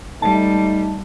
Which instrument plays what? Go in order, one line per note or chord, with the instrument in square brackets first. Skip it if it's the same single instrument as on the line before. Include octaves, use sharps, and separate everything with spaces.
[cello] G3 [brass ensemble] A3 D#4 [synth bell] A5